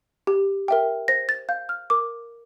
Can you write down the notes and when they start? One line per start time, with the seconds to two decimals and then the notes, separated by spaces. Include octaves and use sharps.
0.27 G4
0.68 A#4 E5 G5
1.08 C5 A#6
1.29 A6
1.49 F5 G6
1.69 F6
1.90 A#4 D6